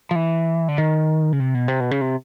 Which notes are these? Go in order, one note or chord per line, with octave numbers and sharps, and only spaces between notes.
F3
E3
D3
D#3
C#3
C3
B2
C3
B2
C#3
C3